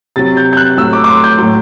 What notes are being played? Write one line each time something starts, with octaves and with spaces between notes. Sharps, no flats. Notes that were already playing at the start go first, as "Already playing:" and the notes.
C3 F#3 A6
G6
G6
F#6
A2 F#3 E6
D6
D6
C6
G6
A2 F#3